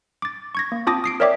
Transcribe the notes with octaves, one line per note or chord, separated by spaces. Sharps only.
D6 A6
C#6 G#6 A#6
A#3
C4 F4 A5 D6 D#6 A#6
D#6 C7 D7
A#4 C#5 D5 E5 G5 D6